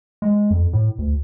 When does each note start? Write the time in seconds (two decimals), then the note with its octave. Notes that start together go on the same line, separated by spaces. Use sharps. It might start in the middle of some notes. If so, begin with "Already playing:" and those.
0.22 G#3
0.51 F2
0.73 A2
0.99 D2